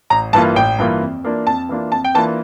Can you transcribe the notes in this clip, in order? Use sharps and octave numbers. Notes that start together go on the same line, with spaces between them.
A1 A#5
G2 E3 A#3 F4 A5
A1 G5
G2 E3 A#3 F4
F2
E3 A#3 D4 F4
F2 A5
E3 A#3 D4 F4
F2 A5
G5
E3 A#3 D4 F4 A5